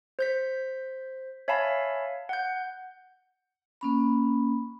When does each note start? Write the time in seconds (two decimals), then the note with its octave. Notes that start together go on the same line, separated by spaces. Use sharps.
0.19 C5 G6 B6
1.48 C#5 E5 F5 G#5 A5 B5
2.29 F#5 G6
3.81 A#3 C#4 B5